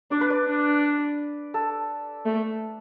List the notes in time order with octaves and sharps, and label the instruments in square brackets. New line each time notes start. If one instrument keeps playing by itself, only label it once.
[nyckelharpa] D4 [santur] D5
[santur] B4
D5
[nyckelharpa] D4
[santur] A4
[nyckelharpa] A3